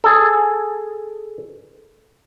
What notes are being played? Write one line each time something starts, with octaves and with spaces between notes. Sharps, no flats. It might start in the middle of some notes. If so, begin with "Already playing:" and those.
G#4 A4